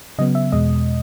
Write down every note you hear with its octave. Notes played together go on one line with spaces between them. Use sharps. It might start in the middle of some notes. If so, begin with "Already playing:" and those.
C#3 F#3 B3 D#5
E5
E2 B2 G#3 D#5